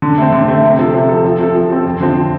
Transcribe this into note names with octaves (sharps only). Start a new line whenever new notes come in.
D3
A3 C4
D3
A3 C4
C3
F3 C4 A4
C3
F3 C4 A4
F3
C4 A4
F3
C4 A4
F2
D3 F3 C4